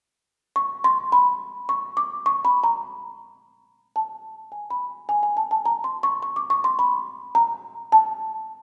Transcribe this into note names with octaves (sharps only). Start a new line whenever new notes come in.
C#6
C6
B5
C#6
D6
C#6
B5
A#5
A5
G#5
B5
G#5
G#5
A5
A5
A#5
C6
C#6
C#6
D6
C#6
C6
B5
A#5
A5